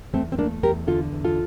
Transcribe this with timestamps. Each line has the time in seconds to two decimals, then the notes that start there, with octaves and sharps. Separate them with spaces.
0.13 E2 A3 C4
0.32 C4
0.38 A3 A#3 D4
0.63 E2 G4 A#4
0.87 D3 F4 A4
1.12 E2
1.24 F4 A4